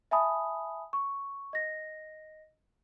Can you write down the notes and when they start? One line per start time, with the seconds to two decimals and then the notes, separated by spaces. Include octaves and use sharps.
0.11 E5 G#5 A5 B5 D#6
0.93 C#6
1.53 D#5 A#6